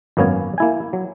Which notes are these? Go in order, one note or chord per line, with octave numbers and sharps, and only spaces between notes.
G#1 F#2 A#3 B3 C#4 G#5
A#3 E4 G#5
F#3